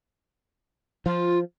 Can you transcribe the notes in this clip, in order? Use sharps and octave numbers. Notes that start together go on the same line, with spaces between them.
F3 F4